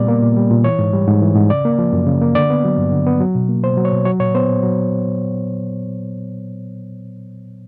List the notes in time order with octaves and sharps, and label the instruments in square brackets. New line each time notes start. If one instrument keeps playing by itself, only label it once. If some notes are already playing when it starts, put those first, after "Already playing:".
Already playing: [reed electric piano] A#2 G3 B3 D5
A#3
A#2
G3
A#2
E3 C#5
G#2
G3
G#2
E3
G#2
C#3 D5
A#3
F3
F#2
C#3
A#3
D3 D5
B3
F#3
G2
D3
B3
F#3
B2
A#3
B2 C5
F#3
C#5
B2
F#3 C#5
A#2 C#5
B3 C5
A#2
F#3